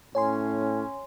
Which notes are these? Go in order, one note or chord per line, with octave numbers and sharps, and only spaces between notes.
A2 C#4 C#5 G#5 C6